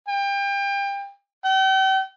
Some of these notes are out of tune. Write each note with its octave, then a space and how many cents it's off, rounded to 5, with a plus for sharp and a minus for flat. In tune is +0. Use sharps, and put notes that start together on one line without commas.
G5 +30
G5 -40